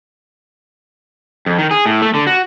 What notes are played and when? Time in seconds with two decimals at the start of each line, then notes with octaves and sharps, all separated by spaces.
1.46 F2
1.58 D#3
1.71 G#4
1.86 A2
2.02 A3
2.14 D3
2.27 F#4